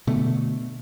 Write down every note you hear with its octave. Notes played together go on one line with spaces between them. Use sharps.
B2 D3 A3